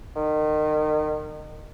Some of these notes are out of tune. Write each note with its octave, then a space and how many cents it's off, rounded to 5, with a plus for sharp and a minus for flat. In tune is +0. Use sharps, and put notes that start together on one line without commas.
D#3 -30